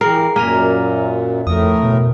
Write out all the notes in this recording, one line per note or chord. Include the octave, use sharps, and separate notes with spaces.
E3 G4 G#4 A#4 C7
F#2 A#2 A#3 A#4 G#5 A#5
F2 A2 A3 A#4 D#6
B2